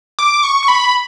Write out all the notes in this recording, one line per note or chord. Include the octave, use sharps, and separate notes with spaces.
D6
C#6
C#6
B5